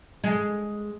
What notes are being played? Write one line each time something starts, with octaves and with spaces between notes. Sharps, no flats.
G#3